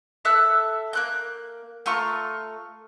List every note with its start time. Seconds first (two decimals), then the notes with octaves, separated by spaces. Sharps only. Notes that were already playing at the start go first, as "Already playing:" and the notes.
0.25 A4 E5 E6 F#6
0.93 A#3 F#6 G6
1.86 A3 F4 A#5 C#6